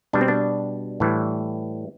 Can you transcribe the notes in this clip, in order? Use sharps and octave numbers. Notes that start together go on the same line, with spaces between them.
B2 G3 D4
C4
D4
A2 E3 G3